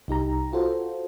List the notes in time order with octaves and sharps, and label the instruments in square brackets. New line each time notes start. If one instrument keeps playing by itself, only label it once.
[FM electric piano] C2 D#4 G4 A#5
F4 F#4 A4 C5